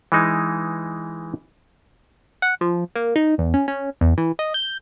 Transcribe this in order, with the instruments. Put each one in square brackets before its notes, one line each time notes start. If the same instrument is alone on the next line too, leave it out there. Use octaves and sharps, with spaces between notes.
[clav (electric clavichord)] E3 G#3 D#4
[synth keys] F#5
F3
A#3
D#4
E2
C#4
C#4
E2
E3
D#5
G6